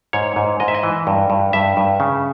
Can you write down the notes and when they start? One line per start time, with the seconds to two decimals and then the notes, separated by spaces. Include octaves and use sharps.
0.13 G#2 C#5
0.36 G#2
0.60 G#2 D#5
0.68 E5
0.75 D#5
0.83 E3
1.07 G2
1.30 G2
1.53 G2 E5
1.77 G2
2.00 C#3